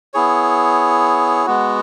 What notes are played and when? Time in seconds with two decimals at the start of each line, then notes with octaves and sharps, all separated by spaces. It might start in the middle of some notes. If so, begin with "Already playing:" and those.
0.14 B3 E4 G#4 C#5
1.46 G#3 B3 F#4